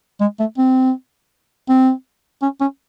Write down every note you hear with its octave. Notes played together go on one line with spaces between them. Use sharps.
G#3
A3
C4
C4
C#4
C#4